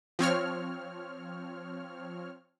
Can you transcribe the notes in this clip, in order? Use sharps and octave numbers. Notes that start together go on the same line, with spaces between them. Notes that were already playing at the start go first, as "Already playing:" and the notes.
F3 C4 C#5 F6